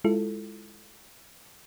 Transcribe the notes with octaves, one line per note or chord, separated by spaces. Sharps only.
G#3 E4 F4 A4